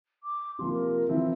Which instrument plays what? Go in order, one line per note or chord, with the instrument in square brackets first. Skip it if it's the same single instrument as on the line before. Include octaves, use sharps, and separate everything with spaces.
[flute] D6
[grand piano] C3 F3 A#3 [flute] C6
[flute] A#4
[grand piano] E3 F3 C4 [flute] E5